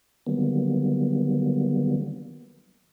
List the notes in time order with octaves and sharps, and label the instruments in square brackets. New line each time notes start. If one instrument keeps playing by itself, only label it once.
[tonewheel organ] D3 D#3 F#3 G3 A#3 B3